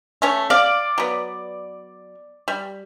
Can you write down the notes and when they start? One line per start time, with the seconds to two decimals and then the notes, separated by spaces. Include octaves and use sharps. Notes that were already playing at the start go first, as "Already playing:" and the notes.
0.22 A3 C#4 C#5
0.50 D5 F5
0.98 F#3 B3
2.48 G3